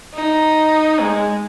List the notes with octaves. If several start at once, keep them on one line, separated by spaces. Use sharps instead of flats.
D#4
G#3